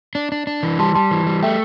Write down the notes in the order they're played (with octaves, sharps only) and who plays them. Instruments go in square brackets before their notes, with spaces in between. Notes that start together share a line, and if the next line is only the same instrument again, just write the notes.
[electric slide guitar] D4
D4
D4
E3
[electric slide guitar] G3 [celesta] A5 C6
[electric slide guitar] G3 [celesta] A5 C6
[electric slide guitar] E3
G3
[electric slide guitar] A3 [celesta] E5 G5